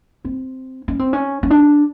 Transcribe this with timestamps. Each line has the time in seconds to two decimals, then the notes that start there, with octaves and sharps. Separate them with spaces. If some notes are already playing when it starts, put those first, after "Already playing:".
0.25 C4
0.88 C#4
0.99 C4
1.13 C#4
1.43 C#4
1.50 D4